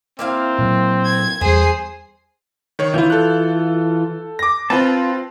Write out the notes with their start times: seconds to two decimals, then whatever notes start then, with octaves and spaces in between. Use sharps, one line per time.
0.19 A#3 C4 E4 F5
0.58 A#2 F#3
1.06 G#6
1.41 E2 G3 G#4 C5 C7
2.79 D#3 C#5
2.94 E3 E4 F4 G6
3.10 A4 F#6
4.39 D6 A#6
4.70 C4 F4 B4 A5